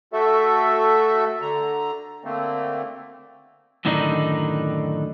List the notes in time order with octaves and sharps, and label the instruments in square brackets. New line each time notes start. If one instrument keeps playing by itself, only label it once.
[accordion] A3 F#4 A4 E5
D3 A#5
D3 A3 A#3 C4
[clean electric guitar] F#2 A2 D3 D#3 D4 D#4